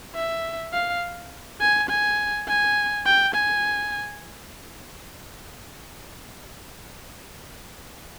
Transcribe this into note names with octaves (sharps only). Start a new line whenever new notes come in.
E5
F5
G#5
G#5
G#5
G5
G#5